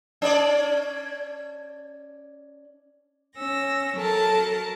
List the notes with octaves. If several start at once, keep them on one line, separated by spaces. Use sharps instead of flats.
C#4 D5
C#4 E6 A#6
F#3 A4 A#4 A5